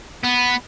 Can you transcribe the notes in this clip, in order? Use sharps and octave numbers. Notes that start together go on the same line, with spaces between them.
B3